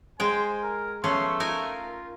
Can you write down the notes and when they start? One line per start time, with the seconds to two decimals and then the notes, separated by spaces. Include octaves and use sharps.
0.20 G#3 C5 G5 G#5
0.63 A#4
1.04 F3 A3 B3 C#4 C6
1.40 D#4 F4 A#4 G#5